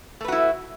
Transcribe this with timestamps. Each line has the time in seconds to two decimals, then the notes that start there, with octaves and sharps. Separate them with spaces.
0.21 A3
0.24 B4
0.28 F#4
0.32 E4